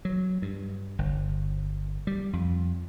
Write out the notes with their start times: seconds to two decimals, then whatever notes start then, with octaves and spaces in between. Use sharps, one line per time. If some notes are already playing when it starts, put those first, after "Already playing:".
0.05 F#3
0.42 G2
0.99 G1
2.07 G3
2.33 F2